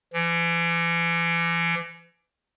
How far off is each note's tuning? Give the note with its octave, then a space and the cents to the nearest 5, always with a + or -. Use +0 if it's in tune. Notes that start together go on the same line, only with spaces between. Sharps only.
E3 +40